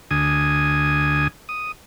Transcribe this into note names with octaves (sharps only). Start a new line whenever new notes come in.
D2 G#5 D#6
D#6